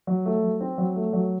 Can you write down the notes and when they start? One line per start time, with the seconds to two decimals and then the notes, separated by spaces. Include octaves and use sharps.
0.07 F#3
0.26 A3
0.43 F#3
0.61 C4
0.78 F#3
0.96 A3
1.13 F#3